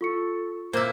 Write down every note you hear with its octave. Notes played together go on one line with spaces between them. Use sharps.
F4 A4 C#6 C#7
A#2 A#3 E4 C5 D6 E6